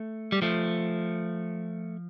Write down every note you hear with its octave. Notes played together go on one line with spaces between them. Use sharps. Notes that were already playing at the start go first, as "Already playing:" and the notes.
Already playing: A3
G3
F3 A3